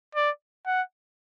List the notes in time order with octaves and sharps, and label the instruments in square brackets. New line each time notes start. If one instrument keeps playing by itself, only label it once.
[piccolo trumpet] D5
F#5